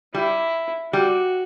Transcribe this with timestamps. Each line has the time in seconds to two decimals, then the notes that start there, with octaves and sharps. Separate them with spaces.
0.14 G3 E4
0.93 G3 F#4